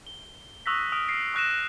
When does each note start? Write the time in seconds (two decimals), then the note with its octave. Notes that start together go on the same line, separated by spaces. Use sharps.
0.07 G7
0.66 C#6 D#6 E6 F#6 A#6 B6
0.92 D#6 F6 D7
1.08 F6 A#6 C7 D7
1.34 C#6 D#6 F#6 A#6 D#7 E7